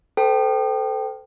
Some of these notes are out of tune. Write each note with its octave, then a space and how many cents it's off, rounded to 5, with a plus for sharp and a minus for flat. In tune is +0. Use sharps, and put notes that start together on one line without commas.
A4 +0 C5 -40 G5 -10